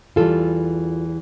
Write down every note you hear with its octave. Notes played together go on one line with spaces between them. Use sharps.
E2 E3 G3 F4 A4